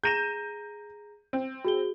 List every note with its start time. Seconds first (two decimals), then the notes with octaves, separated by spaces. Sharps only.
0.04 G#4 A#5 G6 A#6 D#7 E7
1.33 C4
1.65 F#4 G#4 G7